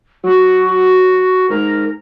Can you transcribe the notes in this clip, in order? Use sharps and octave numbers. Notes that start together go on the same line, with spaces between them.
F#3 F#4
G#2 A#4